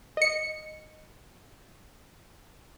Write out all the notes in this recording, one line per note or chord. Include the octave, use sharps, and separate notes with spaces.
D#5 C#7